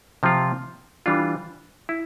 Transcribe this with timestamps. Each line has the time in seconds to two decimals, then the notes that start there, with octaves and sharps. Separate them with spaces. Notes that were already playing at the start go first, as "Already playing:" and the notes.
0.23 C3 F3 C4 F4
1.06 E3 G3 D4 F4
1.89 E4